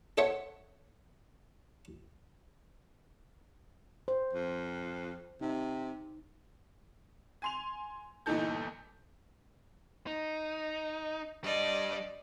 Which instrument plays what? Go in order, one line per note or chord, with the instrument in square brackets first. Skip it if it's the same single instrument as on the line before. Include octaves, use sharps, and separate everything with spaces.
[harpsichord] A4 C5 C#5 E5 F#5
[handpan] C5
[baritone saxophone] F2
[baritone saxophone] C3 [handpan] D#4
[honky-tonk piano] G#5 C6 F7
G1 A#2 E3 D#4 A4 G6
[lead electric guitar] D#4
[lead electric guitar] G3 D4 [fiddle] D5 D#5